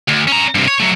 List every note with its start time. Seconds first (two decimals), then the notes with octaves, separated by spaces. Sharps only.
0.08 D2
0.27 C#4 A#5
0.55 G2 C3
0.68 C#5
0.80 F#3 A3